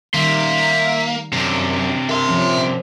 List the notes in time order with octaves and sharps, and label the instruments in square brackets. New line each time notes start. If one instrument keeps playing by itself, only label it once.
[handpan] D#3 G3 [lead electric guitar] A#3 [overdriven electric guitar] E5 C6
[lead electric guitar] F#2 [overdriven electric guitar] C3 D4
[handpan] A#4 [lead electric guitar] E5 C6
[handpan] F3 C#4